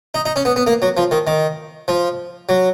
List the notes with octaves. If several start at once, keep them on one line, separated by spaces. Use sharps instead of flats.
D#4
D#4
C#4
B3
B3
A#3
F#3
F3
D#3
D#3
F3
F#3